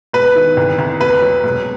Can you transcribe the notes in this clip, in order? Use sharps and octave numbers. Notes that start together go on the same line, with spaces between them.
E1 B4
D#3
C2
C2
F1 B4
F#3
E1